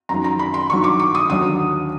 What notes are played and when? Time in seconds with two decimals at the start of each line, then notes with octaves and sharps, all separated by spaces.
0.09 F#2 D#3 F#3 A#5
0.24 A#5
0.39 B5
0.54 C6
0.70 G2 D#3 F#3 C#6
0.84 D6
1.00 D6
1.15 D#6
1.29 D#2 D3 F#3 D#6